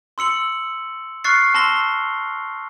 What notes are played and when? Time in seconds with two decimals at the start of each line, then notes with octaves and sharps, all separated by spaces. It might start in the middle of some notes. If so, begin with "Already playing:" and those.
0.18 C6 E6 C#7 F#7
1.24 C#6 F6 F#6 A6 C7 C#7
1.54 A5 C6 E6 A#6 F7 G7